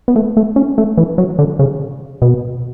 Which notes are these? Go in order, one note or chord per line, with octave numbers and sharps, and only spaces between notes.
B3
A3
A3
C#4
A3
E3
F#3
D3
C#3
B2